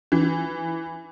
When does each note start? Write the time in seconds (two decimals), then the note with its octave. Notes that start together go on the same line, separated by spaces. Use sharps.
0.12 E3